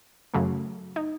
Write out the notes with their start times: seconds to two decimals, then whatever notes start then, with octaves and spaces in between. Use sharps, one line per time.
0.34 F#2 C#3 F#3 A3
0.96 D#4